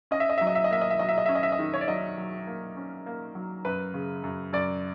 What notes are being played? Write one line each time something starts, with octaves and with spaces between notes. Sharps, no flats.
C#4 D#5
E5
D#5
F#3 E5
D#5
E5
D#5
A#3 E5
D#5
E5
F#3 D#5
E5
D#5
C#4 E5
D#5
E5
D#5
D#3
C#5
D5
F#3 D#5
F#3
A#3
C#4
A#3
F#3
F#2 B4
C#3
F#2
F#2 D5